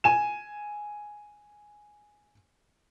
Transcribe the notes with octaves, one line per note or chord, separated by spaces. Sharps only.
G#5 E7